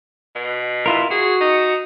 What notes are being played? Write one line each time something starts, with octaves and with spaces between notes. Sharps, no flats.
B2
E4 F4 A#4
F#4 G#4
D#4